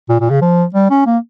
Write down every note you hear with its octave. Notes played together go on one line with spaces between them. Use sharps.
A#2
A#2
C#3
F3
G3
C#4
A#3